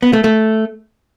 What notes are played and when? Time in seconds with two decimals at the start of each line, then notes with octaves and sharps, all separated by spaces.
0.03 B3
0.13 A3
0.24 A3